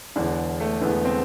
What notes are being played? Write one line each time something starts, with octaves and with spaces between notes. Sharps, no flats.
E1 E2 D3 D4
A3
E1 E2 D3 B3
C4